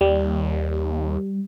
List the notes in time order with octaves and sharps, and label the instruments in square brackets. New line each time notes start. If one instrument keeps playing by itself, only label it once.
[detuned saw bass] D#2 [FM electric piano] G3